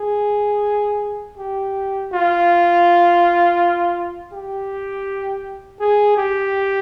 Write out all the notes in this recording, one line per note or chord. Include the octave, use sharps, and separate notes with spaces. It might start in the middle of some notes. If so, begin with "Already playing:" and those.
Already playing: G#4
G4
F4
G4
G#4
G4